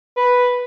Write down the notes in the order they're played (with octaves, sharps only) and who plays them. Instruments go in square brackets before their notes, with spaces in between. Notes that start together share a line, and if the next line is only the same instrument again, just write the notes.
[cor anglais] B4